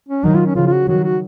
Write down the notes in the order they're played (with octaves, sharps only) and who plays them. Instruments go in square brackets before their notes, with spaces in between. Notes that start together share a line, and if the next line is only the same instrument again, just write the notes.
[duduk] C#4
[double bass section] D#3 F#3 [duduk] D#4
[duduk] F4
C#4
[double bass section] C#3 F3 [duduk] F4
[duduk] F4
F#4
[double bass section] D#3 F#3 [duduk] F#4
[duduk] F#4